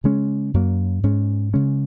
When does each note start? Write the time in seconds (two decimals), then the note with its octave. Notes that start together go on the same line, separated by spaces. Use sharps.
0.04 C#3 G#3 C#4
0.54 F#2 F#3 A#3
1.03 G#2 G#3 C#4
1.54 C#3 G#3 C#4